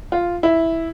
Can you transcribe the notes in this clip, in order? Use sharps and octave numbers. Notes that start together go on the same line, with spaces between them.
F4
E4